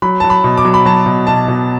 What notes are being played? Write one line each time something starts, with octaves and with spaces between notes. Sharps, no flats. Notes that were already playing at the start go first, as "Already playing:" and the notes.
F#3 B5
F#3 A5
B5
B2
D6
F#3
B5
F#3 A5
B2
B2 A5
B2